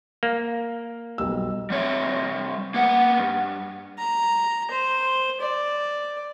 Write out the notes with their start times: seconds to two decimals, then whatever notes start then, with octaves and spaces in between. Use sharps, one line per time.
0.23 A#3
1.18 B1 G3 E6
1.70 G3 C4 C#5 E5
2.74 A#3 B3 F#5
3.19 G2
3.99 A#5
4.71 C5
5.41 D5